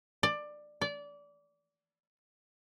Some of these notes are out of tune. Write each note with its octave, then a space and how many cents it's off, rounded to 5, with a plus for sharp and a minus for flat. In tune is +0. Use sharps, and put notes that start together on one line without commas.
D5 +15
D5 -25